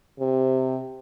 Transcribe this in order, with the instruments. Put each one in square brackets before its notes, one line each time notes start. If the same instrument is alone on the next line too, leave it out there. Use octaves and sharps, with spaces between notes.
[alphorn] C3